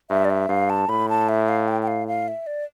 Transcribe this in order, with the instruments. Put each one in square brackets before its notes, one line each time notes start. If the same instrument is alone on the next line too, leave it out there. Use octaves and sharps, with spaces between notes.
[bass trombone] G2 [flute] E5
[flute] D5
E5
[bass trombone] G2 [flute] F5
[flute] A5
[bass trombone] A2 [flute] B5
[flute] A5
E5
F5
G5
G5
F5
F5
E5
D5